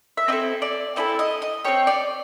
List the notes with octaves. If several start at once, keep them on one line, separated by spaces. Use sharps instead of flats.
E5
C4 E4 A4 D#5
D5
C4 E4 A4 D#5
D#5
D#5
C4 E4 G4 C#5
D5